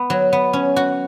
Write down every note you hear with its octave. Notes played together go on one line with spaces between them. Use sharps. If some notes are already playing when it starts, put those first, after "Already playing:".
Already playing: B3
F#3
B3
C#4
F#4